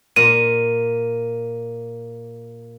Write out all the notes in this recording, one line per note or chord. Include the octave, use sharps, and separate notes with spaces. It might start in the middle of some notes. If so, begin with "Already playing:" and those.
A#2 D#7